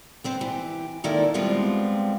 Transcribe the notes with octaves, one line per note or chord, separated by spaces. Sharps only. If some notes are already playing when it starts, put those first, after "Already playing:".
B3 C4 C5
E3 G4
F2 A#2 D#3 E4 A4 D5
F3 G3 G#3 B3 C4 F4